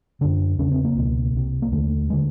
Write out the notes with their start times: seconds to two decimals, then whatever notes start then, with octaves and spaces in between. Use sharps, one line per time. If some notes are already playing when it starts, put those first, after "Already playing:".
0.21 F#2 D3 D4
0.59 E2 C#3 C#4
0.71 C4
0.84 A#3
0.96 C#2 B2
1.34 C2 C3
1.62 A#3
1.72 D#2 D3 A3
2.10 D3 G#3